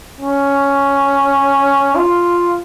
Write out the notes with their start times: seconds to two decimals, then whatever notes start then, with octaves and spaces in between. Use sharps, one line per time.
0.21 C#4
1.95 F4